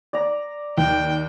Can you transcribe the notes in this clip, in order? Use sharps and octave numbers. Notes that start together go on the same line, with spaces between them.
D5 A#5
D#2 G5